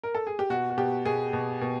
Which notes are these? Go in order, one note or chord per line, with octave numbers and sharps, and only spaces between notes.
A#4
A4
G#4
G4
B2 F#4
F#4
B2 G4
B2 G#4
B2
B2